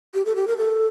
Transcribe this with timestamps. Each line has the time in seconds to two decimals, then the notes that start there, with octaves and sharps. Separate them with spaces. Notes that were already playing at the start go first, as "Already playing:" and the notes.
0.14 G4
0.25 A4
0.36 G4
0.48 A#4
0.58 A4